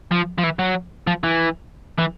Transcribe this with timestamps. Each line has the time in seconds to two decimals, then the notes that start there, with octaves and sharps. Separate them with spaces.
0.11 F3
0.38 F3
0.43 E3
0.59 F#3
1.07 F3
1.24 E3
1.98 E3